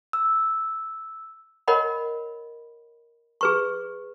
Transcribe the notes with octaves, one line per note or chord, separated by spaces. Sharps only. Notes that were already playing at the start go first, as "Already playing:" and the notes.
E6
A#4 C#5 D#5 F#5 B5
G#4 B4 C#6